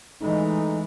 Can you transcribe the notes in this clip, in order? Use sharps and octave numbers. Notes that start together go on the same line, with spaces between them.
E3 G#3 A3 D#4